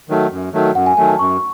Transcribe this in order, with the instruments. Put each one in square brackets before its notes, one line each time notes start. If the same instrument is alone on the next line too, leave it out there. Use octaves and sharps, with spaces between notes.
[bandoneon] D#3 F#3 A3
F#2
D#3 F#3 A3
[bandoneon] F#2 [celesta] F#5
[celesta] G#5
[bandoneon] D#3 F#3 A3 [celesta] G#5
[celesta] A5
[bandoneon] F#2 [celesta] C#6